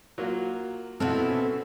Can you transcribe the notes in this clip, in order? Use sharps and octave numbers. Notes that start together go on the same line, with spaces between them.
F#3 A#3 F4
B2 B3 C4 E4 A4 F#5 F6
C#4